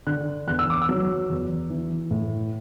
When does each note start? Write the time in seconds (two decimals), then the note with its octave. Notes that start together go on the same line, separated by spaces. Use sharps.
0.07 D3 F#6
0.47 E2 F#6
0.59 E6
0.70 D6
0.81 E6
0.89 F#3
1.30 E2
1.70 E3
2.11 A2